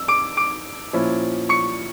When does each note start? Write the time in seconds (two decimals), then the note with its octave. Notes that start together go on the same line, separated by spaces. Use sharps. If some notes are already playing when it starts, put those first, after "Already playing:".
Already playing: E6
0.08 D6 D7
0.37 D6 D7
0.93 A#2 F3 C#4 E4
1.49 C#6 C#7